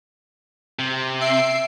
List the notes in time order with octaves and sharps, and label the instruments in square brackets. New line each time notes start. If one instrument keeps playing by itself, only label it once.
[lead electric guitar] C3
[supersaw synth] E5 C7 D7